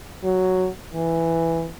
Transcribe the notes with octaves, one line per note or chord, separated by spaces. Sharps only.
F#3
E3